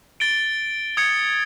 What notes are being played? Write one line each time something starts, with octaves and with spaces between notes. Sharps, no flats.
A6 D7 G7
D#6 G#6 C#7